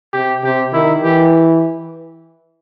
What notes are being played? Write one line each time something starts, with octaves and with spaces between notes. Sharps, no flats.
C3 G4
C3 G4
D#3 E4
E3 G4